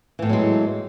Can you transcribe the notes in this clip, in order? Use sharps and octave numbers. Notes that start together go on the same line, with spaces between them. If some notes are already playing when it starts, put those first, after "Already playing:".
A2 E3 F#3 G#3 B3